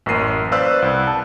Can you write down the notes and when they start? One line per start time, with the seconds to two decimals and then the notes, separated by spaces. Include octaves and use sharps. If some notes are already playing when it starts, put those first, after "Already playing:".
0.06 A1 F#2 A#3 C7 D#7
0.52 B4 C5 D5 F5 E6 F#6
0.82 C2
1.07 A5